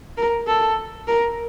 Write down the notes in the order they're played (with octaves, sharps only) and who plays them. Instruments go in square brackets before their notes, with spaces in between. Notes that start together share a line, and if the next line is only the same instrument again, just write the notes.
[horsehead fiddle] A#4
A4
A#4